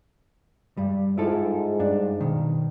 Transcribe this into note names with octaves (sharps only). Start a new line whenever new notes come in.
G2 G3
G#2 E4 F4 A4
G2 D4
B2 D#3